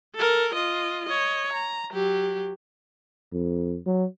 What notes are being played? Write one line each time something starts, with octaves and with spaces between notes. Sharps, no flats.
A4 A#4
F4 D#5
C#5 D#5
A#5
F#3 G4
F2
F#3